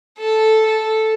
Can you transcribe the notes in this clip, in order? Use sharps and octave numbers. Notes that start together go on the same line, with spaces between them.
A4
A4